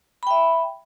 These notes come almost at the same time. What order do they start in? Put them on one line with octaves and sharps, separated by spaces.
B5 G5 E5